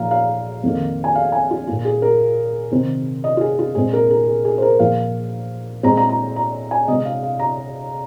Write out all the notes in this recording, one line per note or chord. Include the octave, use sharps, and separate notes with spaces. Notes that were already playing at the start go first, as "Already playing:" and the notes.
Already playing: A#2 F3 A#3 F5 A#5
F5
F2 D#3 A#3
G#5
F5
G#5
F4
A#2 A#3 F4
G#4
A#4
C3 D#3 C4
D#5
F4
G#4
F4
A#2 G#3 C4 G#4
A#4
A#4
G#4
G#4
C5
A#4
A#2 F3 A#3 F5
A#2 G#3 C4 A#5
A#5
A#5
A#5
G#5
C3 G#3 C4 D#5
F5
F5
A#5